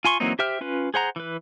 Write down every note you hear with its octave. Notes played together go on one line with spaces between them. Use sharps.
F4 G#5 C6 C#6
E3 F#3 A#3 C4 D#4
G4 C5 E5 G5 F6
C#4 F4 B4
G#4 C5 F#5 A#5
E3 B4